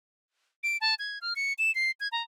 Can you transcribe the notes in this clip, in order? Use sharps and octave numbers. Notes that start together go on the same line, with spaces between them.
D7
A5
G#6
F6
C#7
E7
C7
G#6
A#5